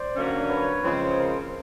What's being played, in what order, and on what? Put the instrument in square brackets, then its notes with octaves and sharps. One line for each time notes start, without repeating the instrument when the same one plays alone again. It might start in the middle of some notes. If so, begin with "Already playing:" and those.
Already playing: [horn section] C5 D5
D3 F#3 A#3 C#4
B4 C#5
C#3 F3 G#3 C4
A#4 C5